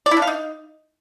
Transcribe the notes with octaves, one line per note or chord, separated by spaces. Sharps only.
D5
E4
D4
F5
D#4